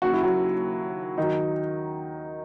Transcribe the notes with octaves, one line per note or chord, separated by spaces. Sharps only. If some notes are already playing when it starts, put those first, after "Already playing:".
D#2 C#3 F#3 F#4
E4
F#3 F#4
D#3 F#3 D#4